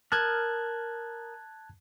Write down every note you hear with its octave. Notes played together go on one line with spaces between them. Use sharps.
A#4 A5 D#6 F6 F#6 G#6